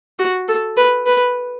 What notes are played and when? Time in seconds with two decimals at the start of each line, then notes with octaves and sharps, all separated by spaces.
0.19 F#4
0.48 A4
0.77 B4
1.06 B4